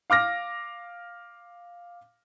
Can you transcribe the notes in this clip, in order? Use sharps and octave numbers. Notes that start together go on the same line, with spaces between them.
F5 D6 F6 A#6